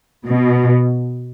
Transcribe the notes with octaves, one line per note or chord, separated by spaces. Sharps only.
B2